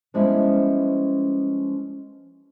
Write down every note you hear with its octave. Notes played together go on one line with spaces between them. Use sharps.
F3 G3 G#3 B3 C#4 E4